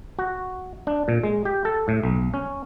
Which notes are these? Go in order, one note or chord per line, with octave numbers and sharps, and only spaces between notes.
F#4
D4
A#2
G#3
G4
A4
A2
B1
C#4